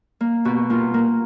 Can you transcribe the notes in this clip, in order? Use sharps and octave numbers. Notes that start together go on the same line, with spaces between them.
A#3
B2 F#4
A#3 F4
A#3